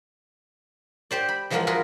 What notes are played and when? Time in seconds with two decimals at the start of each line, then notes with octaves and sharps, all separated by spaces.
1.11 G4 C5 D5
1.29 B5
1.50 E3 F3 G#3 A#3 F4 F#5
1.67 F4 F#4 G#4 A#4 B4